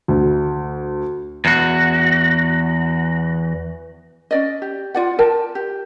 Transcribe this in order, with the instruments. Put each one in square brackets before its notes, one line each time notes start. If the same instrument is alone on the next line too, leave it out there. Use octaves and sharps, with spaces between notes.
[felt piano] D2
[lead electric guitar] E2 F#4
[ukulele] C#4 D5 D#5
G4
F4 D5 F#5
A#4 D5 G5 A5
G4